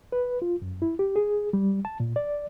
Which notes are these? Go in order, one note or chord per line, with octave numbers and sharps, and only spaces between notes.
B4
F4
F#2
E4
G4
G#4
G3
A5
A#2
D5